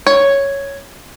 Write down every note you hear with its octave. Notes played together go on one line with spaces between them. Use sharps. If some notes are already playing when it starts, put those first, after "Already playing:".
C#5